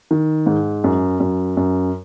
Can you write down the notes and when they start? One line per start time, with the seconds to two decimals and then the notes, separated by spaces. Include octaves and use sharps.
0.11 D#3
0.46 G#2
0.84 F#2
1.20 F#2
1.57 F#2